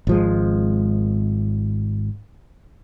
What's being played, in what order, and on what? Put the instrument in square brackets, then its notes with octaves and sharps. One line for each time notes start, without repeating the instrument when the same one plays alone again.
[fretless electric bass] G#1 F3 G#3